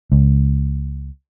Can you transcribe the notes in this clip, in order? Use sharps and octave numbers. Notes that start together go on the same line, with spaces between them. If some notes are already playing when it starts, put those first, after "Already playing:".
C#2